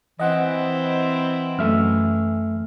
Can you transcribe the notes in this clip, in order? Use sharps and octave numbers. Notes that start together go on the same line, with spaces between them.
E3 C4 E4 D#5 F#5
F#2 A3 E5 F6